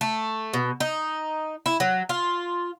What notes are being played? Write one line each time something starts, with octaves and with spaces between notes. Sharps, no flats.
A3
B2
D#4
E4
F#3
F4